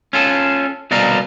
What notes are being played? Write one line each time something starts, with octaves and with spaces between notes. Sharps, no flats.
C#4 F4 A4
C2 B2 D5 D#5 F5 A#5